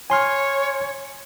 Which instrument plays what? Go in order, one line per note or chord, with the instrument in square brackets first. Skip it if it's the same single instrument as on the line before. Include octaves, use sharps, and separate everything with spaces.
[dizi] C#5 [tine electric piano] G#5 C6 F6